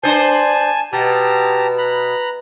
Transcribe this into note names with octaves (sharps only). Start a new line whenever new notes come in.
D4 C5 G#5 A5
B2 G4 A5 A#5
A#5 B5 F#6